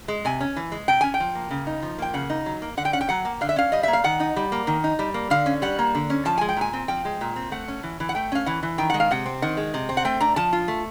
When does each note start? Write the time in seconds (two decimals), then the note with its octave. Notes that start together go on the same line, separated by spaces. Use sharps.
0.08 G#3
0.25 C3 G#5
0.41 C#4
0.56 E3
0.72 G#3
0.88 C3 G5
1.01 C#4 G#5
1.14 G5
1.20 F3
1.35 A#3
1.51 C#3
1.67 D#4
1.82 F3
1.99 A#3 G5
2.14 C#3 F#5
2.30 D#4
2.46 F#3
2.62 A#3
2.77 D3 F#5
2.85 G5
2.93 C#4 F#5
3.01 G5
3.09 F#3 F#5
3.25 A#3
3.41 D3 F5
3.49 E5
3.56 C#4 F5
3.72 G3 D#5
3.83 A#3 E5
3.93 F5
4.04 D#3 F#5
4.20 D#4
4.36 G3
4.52 A#3
4.67 D#3
4.84 D#4
4.99 G3
5.14 A#3
5.30 D3 F5
5.46 C#4
5.62 G3 F#5
5.79 A#3
5.95 D3
6.10 C#4
6.25 F3 A5
6.38 G#3 G#5
6.49 G5
6.57 A#2 G#5
6.73 C4
6.88 F3 G5
7.05 G#3
7.21 A#2
7.36 C4
7.52 A3 F#5
7.68 C#4
7.83 E3
8.00 E3
8.09 F#5
8.15 A3 G5
8.32 C#4 F5
8.46 E3 F#5
8.63 E3
8.78 D#3 G5
8.90 G#3 F#5
9.00 F5
9.11 C3 F#5
9.26 C4
9.42 D#3 F#5
9.57 G#3
9.74 C3
9.89 C4
9.97 F#5
10.05 A3 G5
10.20 D4 A#5
10.36 F3 A5
10.53 F4
10.68 A3